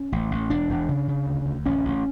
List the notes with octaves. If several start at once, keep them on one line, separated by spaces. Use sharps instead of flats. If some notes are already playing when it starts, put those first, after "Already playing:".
Already playing: C#4
A1
A1
E1 D4
E1
C#3
C#3
D2
D2
A1 C#4
A1